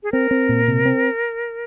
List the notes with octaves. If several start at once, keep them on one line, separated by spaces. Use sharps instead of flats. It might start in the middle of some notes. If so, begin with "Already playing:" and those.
G#4
C4 A#4
C4
A#2
C3
C4